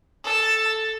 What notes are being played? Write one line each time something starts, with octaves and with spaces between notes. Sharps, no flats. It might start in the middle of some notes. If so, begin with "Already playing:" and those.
A4 A5